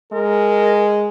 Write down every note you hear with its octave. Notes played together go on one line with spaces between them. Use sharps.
G#3 A#4